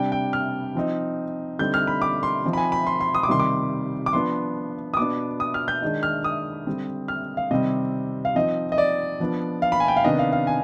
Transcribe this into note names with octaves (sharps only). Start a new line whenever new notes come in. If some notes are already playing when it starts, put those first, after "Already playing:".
Already playing: C3 G3 D4 G5
G5
F6
F3 C4 D#4
D3 G3 C4 D#4 G6
F6
B5
D6
C6
F3 C4 D#4
B5
G#5
B5
C6
C6
D#6
D6
C3 D#3 G3 C6
D6
D6
F3 B3 D4 C6
D#6
B2 B3 D4 D6
D#6
F6
G6
D#3 G#3 D4
F6
D#6
D3 G3 C4
F6
F5
C3 D#3 G3 C4 D#5
F5
F3 C4 D#4 D#5
D#5
D5
F3 B3 D4
F5
B5
G#5
G5
F5
C3 D#3 B3 D4 D#5
F5
F5
G#5